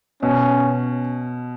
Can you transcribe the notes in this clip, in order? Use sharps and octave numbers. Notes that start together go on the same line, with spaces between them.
B2 C#4